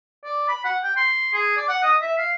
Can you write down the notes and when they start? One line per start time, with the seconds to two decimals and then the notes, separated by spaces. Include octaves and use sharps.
0.24 D5
0.49 B5
0.65 F#5
0.83 G5
0.97 C6
1.34 G#4
1.57 D5
1.69 F#5
1.83 D#5
2.01 E5
2.18 F5